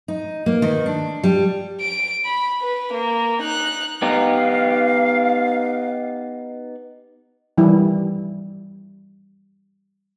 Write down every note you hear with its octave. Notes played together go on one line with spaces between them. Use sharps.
D#4
A#3
D#3
D4
G3
D7
B5
B4
A#3
D#4 F#6
B3 D#4 G4 F5
D#3 E3 G3 E4